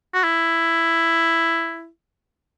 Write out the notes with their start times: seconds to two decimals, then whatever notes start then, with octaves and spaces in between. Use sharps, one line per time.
0.14 F#4
0.23 E4